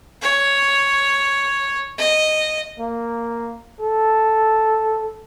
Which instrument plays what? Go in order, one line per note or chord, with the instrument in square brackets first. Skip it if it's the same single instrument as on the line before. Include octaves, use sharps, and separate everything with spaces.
[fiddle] C#5
D#5
[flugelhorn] A#3
A4